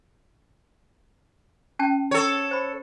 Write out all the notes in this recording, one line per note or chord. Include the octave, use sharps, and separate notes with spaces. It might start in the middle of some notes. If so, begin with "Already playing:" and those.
C#4 G5 A5
A4 C#5
C5 B5